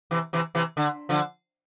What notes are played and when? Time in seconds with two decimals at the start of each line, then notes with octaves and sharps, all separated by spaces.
0.11 C3 E3
0.33 C3 E3
0.55 C3 E3
0.77 D3
1.09 D3 F3